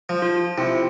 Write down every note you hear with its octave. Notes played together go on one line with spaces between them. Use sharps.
F3
F4
C3 E4 F4